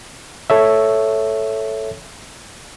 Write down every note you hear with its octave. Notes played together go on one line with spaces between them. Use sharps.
A4 C#5 E5